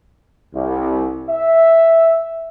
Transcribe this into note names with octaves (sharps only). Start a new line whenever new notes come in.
C2
E5